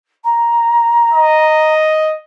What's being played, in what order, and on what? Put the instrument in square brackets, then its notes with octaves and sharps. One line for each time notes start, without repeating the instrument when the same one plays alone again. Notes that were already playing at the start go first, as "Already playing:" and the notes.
[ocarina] A#5
[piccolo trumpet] D#5